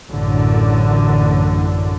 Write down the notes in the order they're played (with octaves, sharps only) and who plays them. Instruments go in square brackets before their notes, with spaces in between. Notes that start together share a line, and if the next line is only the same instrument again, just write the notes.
[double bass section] A1 F#2 A2 D3